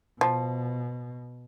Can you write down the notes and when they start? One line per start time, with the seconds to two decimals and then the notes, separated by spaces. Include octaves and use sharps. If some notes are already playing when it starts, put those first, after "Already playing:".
0.21 B2 F3